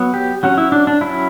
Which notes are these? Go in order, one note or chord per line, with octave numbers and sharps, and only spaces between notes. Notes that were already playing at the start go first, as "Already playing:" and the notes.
Already playing: F#3 B3
G4
F#3 C#4 F#4
E4
D4
D4
F#3 C#4 E4